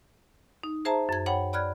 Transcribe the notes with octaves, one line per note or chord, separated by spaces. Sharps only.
D#4
G#4 C5 E5 A5 A#5
F#2 G#6
C#5 F#5 G5 B5
D5 B5 F6 F#6 G#6